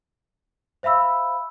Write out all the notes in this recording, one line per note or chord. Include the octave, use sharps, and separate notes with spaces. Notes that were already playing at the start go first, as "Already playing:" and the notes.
C5 E5 F5 B5 E6